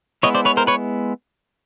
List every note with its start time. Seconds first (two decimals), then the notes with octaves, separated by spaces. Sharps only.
0.23 G#3 B3 E4 C#5 D#5
0.35 C5 D5
0.45 B4 C#5
0.57 A#4 C5
0.67 B4 C#5